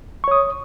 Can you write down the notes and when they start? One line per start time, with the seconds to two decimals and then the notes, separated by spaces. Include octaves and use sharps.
0.24 C#6
0.28 C#5
0.31 D#6